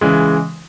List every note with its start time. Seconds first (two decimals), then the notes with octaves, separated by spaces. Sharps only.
0.01 C#3 E3 G#3